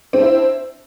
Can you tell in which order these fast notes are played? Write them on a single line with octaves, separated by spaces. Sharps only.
C4 D4 E4